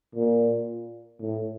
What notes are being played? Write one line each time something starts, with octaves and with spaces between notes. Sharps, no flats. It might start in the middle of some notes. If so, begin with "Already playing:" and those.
A#2
A2